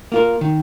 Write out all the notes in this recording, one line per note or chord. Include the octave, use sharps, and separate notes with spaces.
A#3 F4 A#4
D#3